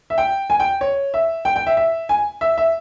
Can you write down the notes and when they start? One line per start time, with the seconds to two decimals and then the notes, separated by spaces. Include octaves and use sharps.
0.10 E5
0.18 G5
0.50 G#5
0.60 G5
0.81 C#5
1.14 E5
1.45 G5
1.56 G5
1.67 E5
1.77 E5
2.09 G#5
2.41 E5
2.58 E5